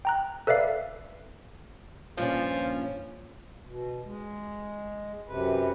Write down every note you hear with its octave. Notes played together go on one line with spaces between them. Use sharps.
G5 A#5 F#6
A4 B4 D5 E5 F5
G2 A#2 F3 C#4
B2
G#3
F#2 C3 B4